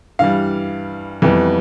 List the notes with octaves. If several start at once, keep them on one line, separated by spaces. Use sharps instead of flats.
G2 E3 G3 F5
F2 E3 G3 B3